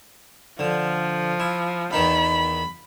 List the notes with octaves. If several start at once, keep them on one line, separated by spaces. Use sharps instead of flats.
D3 F3
E4
E2 D#3 D#4 B5